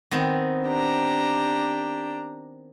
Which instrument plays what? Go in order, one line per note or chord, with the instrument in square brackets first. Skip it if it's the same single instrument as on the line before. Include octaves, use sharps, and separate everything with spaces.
[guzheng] D#3 B3 C4
[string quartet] D4 G4 A#5